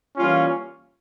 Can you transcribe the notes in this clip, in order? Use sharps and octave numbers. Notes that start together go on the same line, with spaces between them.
E3 G3 A#3 C#4 F4